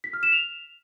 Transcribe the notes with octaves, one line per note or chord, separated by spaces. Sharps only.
B6
F6
E7
F7